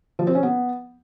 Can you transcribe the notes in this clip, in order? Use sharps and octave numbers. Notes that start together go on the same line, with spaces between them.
F3
C4
C#4
B3